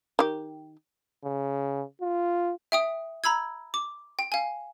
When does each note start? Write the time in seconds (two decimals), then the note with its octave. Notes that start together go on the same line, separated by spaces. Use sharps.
0.19 D#3 G4
1.24 C#3
2.01 F4
2.72 E5 G5 D#6
3.24 A#5 B5 E6 G#6
3.74 D6
4.19 G5
4.32 F5 G#5